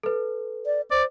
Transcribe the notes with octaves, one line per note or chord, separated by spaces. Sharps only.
A4 B4
D5
C5 D5